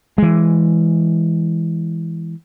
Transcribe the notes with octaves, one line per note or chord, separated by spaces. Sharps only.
E3 G#3